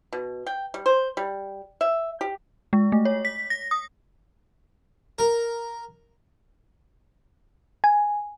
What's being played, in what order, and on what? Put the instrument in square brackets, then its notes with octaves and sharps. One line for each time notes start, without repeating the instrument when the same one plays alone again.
[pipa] B2
G5
G3
C5
G3
E5
G4
[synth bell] G#3
A3
C#5
B6
A#6
D#6
[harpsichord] A#4
[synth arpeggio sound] G#5